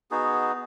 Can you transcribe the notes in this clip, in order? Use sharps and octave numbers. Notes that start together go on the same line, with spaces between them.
B3 D#4 F#4 G#4